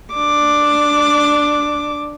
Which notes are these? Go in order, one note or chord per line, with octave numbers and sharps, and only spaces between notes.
D4 D6